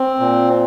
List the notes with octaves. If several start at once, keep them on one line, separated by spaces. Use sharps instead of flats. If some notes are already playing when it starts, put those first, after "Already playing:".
Already playing: C4
A#2